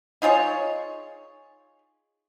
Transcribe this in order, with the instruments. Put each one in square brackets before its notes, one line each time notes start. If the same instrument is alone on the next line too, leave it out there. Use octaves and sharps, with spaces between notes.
[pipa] D#4 F4 G#4 C#5